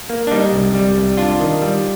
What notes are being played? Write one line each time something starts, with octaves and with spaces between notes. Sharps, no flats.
A#3
D4
G3 D#4
C2
G3
C2
D4 F4
D#3
G3